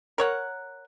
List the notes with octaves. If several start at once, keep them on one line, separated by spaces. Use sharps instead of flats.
A#4 C#5 F#5